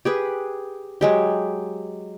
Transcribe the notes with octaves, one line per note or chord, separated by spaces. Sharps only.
G4 G#4 B4
F#3 G#3 G4